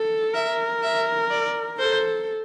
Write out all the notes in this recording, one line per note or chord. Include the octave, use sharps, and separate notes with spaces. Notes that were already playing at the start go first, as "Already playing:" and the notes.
Already playing: A4
A#4 E5
E5
D5
A4 C5